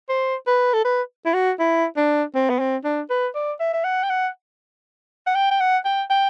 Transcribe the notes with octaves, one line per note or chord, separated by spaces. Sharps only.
C5
B4
A4
B4
E4
F#4
E4
D4
C4
B3
C4
D4
B4
D5
E5
E5
F#5
G5
F#5
F#5
G5
G5
F#5
G5
G5